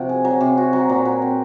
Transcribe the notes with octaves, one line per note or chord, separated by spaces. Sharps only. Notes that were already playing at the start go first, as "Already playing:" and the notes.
Already playing: C3 F3 F#4
G#4
F#3
C3
F#4
F#3
A#2
A#4
C4